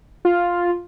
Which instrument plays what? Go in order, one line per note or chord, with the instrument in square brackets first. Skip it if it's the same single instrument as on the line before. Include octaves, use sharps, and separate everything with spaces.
[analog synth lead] F4